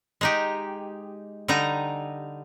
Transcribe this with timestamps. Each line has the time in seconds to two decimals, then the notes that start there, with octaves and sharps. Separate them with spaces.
0.21 G#3 D#4 G4
1.48 D3 G3 D#4 A#5